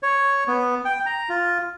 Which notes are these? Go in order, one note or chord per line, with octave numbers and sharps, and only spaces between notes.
C#5
B3
G5
A#5
F4